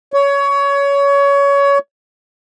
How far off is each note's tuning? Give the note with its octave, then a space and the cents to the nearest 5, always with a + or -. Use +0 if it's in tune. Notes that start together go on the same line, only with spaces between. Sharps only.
C#5 +20